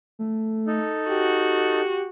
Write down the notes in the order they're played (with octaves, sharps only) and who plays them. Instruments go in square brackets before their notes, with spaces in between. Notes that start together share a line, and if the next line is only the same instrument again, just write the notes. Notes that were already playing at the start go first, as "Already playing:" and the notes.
[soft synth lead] A3
[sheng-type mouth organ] D#4 A4
[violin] F#4 [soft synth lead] G4